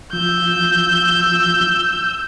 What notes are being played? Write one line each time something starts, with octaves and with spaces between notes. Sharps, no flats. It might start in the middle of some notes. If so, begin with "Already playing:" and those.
F3 E6 G6